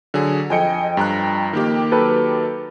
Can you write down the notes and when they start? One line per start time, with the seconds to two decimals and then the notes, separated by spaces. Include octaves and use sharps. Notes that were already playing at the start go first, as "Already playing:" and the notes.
0.14 D3 F#3 G#4
0.50 F2 D#5 G5 G#5 C#7
0.97 G2 A#5 F#6
1.53 D#3 A#3 G4
1.92 F#3 A4 B4